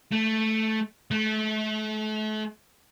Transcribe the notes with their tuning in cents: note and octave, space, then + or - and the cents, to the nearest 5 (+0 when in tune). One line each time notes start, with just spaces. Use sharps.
A3 -5
A3 -35